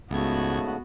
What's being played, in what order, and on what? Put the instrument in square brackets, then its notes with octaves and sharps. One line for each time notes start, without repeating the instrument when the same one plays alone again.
[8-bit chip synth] C#2 G#6 [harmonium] G#2 C#3 A3 [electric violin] B3 F#4